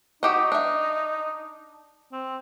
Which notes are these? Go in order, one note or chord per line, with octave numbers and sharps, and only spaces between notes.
D#4 F#4 G4 D#5
D4 E5
C4